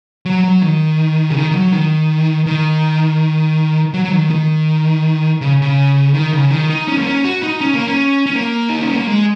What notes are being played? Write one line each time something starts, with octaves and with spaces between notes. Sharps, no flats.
F#3
F#3
D#3
C#3
D#3
D#3
F#3
D#3
D#3
F#3
F#3
D#3
D#3
C#3
C#3
D#3
C#3
D#3
D#4
C#4
A#3
C#4
F#4
D#4
C#4
A#3
C#4
C#4
A#3
D#4
C#4
A#3
G#3